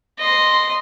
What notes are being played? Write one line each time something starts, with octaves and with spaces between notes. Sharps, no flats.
D#5 C6